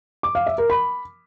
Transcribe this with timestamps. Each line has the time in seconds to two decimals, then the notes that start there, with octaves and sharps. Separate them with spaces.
0.23 D6
0.35 F5
0.47 E5
0.58 A#4
0.70 B5